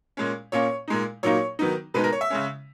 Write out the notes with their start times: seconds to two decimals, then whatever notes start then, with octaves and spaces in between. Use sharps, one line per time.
0.17 A#2 G#3 C#4
0.52 A#2 A#3 C#4 C#5
0.88 A#2 G#3 D#4
1.23 A#2 F#3 A#3 D#4 C#5
1.59 D#3 F#3 B3 D#4
1.94 B2 G#3 B3 D#4 B4
2.04 A#4
2.12 C#5
2.21 E5
2.30 C#3 G#3 C#4